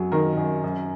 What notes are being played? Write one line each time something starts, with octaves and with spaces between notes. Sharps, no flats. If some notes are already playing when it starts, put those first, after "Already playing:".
Already playing: F#2 F#3
D#3 A#4
F#2
F#2